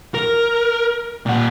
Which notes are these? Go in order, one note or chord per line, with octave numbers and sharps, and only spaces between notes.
A#4
A#2 F#5